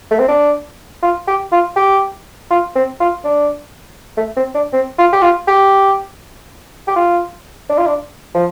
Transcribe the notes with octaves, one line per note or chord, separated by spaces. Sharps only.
A3
C4
D4
F4
G4
F4
G4
F4
C4
F4
D4
A3
C4
D4
C4
F4
G4
F4
G4
G4
F4
D4
F4
D4
F3